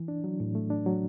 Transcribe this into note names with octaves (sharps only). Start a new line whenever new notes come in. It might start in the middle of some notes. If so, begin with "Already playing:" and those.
Already playing: E3
D4
F#3
A2
A3
D4
F#3